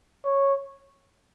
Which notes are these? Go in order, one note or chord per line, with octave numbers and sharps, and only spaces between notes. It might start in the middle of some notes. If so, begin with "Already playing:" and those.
C#5